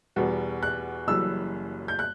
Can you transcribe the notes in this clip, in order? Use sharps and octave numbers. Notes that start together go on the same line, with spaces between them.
E2 B2 G3 B3
F#6
F#1 F#2 E3 G3 E6
G6
F#6